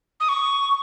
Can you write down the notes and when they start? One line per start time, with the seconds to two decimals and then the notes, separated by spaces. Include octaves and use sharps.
0.20 D#6
0.29 C#6